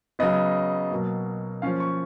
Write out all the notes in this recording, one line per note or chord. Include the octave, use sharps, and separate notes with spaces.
C#3 F#3 B3 D#5
B2 F#3 A#3
F3 A#3 C#4 F5
C#6